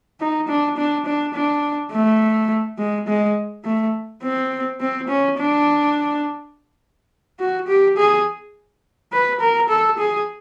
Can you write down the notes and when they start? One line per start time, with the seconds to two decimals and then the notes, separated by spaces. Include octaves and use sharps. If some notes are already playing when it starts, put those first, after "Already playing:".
0.20 D#4
0.49 D4
0.77 D4
1.06 D4
1.34 D4
1.92 A3
2.78 G#3
3.08 G#3
3.65 A3
4.23 C4
4.80 C4
5.08 C#4
5.38 D4
7.40 F#4
7.68 G4
7.98 G#4
9.13 B4
9.40 A#4
9.70 A4
9.99 G#4